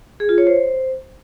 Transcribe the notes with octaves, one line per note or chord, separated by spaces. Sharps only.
G#4
F4
C#5
C5